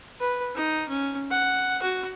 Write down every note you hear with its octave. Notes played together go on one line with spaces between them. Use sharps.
B4
D#4
C#4
F#5
F#4